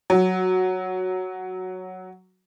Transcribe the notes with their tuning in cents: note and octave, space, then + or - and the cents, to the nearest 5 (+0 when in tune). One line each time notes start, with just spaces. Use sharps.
F#3 +0